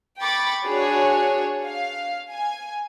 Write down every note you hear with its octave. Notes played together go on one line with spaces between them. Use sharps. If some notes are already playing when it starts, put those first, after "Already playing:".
G5 B5 C#6 D6 A6
D4 F#4 G#4 C#5
F5
G#5